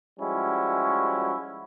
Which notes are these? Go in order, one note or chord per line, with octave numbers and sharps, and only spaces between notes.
F3 G3 G#3 C#4 E4 F#4